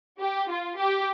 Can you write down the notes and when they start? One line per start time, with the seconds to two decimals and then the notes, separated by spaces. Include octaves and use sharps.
0.21 G4
0.50 F4
0.79 G4